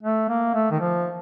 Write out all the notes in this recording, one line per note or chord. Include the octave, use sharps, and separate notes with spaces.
A3
A#3
A3
D#3
F3